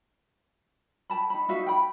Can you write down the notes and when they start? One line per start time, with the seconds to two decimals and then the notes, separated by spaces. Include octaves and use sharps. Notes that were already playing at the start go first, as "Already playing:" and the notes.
1.10 G5 A5 B5
1.30 D#4 B5
1.49 D#4 F#4 E5 F5
1.67 G5 B5